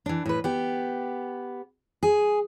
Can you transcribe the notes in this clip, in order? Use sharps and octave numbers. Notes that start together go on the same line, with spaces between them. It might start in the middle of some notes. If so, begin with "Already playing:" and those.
E3 D4
A2 B4
B3 G4
G#4